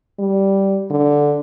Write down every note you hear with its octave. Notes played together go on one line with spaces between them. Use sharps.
G3
D3